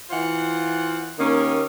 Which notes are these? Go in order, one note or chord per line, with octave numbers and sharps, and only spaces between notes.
E3 F4 C5 F#5
D#2 D#3 A#3 C#4